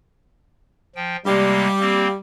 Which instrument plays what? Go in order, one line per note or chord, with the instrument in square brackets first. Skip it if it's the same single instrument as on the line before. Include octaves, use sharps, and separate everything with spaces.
[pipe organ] F3 G5
[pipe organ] C3 G#3 A#3 [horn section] G3
[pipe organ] A#3 C4